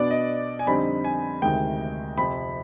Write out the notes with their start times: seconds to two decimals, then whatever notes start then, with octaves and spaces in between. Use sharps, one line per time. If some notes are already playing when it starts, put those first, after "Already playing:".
Already playing: B2 B3 D4 D5
0.11 D#5
0.59 G#5
0.66 F2 D3 G3 C4 D#4 B5
1.04 G#5
1.42 D2 C3 D#3 G#3 G5
2.17 F2 C3 F3 B5